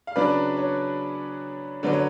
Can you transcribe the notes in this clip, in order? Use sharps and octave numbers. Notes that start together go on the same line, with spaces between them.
F5
C#3 F#3 B3 D4 B4 D5
C#5
D3 F#3 B3 D5
C#5